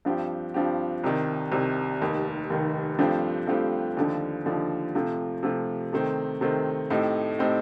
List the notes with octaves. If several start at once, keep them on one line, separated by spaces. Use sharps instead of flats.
G2 F3 C4 G4
G2 F3 C4 G4
C2 C3 D#3
C2 C3 D#3
F1 D#2 D#3
F1 D#2 D#3
G2 F3 A3 C4 G4
G2 F3 A3 C4 G4
D#2 D3 F3
D#2 D3 F3
C3 F3 A3
C3 F3 A3
C3 D#3 A3 C4
C3 D#3 A3 C4
A2 A3 C4 D#4 G4
A2 A3 C4 D#4 G4